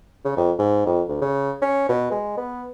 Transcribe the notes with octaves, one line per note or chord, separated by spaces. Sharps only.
C#3
F2
G#2
F2
D2
C#3
C#4
B2
G#3
B3